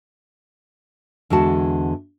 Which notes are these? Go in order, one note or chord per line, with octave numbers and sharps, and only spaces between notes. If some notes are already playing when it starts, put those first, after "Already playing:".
E2 D3 G#3 F#4 A5